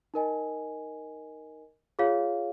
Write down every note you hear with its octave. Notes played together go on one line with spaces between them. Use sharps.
D#4 A#4 D#5 G#5
F4 G#4 C#5 F5